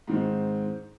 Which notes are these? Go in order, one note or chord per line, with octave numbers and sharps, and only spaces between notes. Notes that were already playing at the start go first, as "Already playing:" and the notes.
G#2 D#3 C4